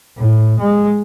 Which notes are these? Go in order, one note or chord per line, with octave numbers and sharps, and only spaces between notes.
A2
G#3